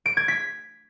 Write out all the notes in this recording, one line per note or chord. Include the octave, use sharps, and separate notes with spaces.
D7
G#6
B6